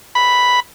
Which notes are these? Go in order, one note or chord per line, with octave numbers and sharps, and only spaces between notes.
B5